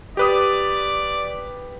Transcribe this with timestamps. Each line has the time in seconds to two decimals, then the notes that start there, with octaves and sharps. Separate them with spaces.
0.17 G4 B4 D5 D#6